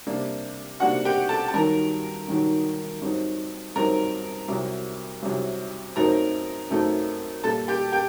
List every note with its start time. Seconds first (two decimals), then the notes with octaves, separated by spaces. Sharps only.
0.07 C3 G3 A#3 D4
0.80 C3 G3 A#3 D4 F#4 F#5
1.05 G4 G5
1.29 A4 A5
1.48 A5
1.54 G2 D#3 F#3 A#4 A#5
2.28 G2 D#3 F#3
3.02 G2 F#3 C4 D#4
3.76 G2 F#3 C4 D#4 A#4 A#5
4.48 C2 C3 F#3
5.23 C2 C3 F#3
5.96 F#2 F#3 A3 C4 D#4 A#4 A#5
6.70 F#2 F#3 A3 C4 D#4
7.44 A#2 G3 A#3 A4 A5
7.68 G4 G5
7.92 G4 G5